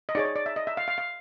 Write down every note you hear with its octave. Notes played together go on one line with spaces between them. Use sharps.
D#5
D#4 G#4 C#5 D5
C#5
D5
E5
D#5
E5
F5
F5
F5